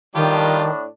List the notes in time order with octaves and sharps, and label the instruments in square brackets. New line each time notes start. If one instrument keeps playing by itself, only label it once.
[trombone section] A2 D4 [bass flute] D#3 [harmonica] G3 F4 G4